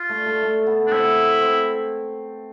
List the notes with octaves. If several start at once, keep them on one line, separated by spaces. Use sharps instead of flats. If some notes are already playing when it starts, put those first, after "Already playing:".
Already playing: F4
A3
A3
A3
B3
D4
C4 E4
C4